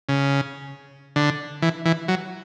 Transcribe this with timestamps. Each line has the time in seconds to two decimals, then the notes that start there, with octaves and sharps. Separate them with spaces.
0.09 C#3
1.16 D3
1.62 E3
1.85 E3
2.08 F#3